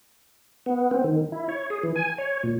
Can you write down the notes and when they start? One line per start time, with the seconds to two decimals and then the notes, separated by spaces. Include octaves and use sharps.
0.66 B3
0.91 C4
1.04 D#3
1.32 E4
1.49 C#5
1.70 G#4
1.83 E3
1.96 G#5
2.18 C#5
2.43 A#2